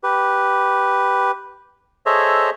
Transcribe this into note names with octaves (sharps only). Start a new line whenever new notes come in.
G4 B4
G#4 A4 C5 C#5 D#5 E5